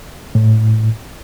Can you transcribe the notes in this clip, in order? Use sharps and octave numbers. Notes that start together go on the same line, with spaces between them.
A2